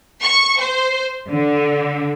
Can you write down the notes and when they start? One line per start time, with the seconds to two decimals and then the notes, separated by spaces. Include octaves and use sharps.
0.22 C#6
0.60 C5
1.28 D3